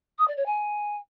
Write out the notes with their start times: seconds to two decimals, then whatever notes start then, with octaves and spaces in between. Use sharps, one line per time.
0.18 D#6
0.27 D5
0.36 C#5
0.46 G#5